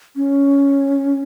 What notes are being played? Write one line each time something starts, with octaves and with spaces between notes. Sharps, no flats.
C#4